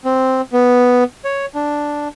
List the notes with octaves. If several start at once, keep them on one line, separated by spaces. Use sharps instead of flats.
C4
B3
C#5
D4